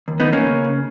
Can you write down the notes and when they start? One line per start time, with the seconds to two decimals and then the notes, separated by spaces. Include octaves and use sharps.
0.08 D#2
0.20 B3 D#4
0.26 E3
0.33 A#3 C#4
0.46 C#3
0.64 C#3